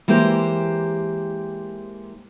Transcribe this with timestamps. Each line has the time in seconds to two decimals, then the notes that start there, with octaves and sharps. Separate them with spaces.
0.08 E3 G#3 A#3 G4 C5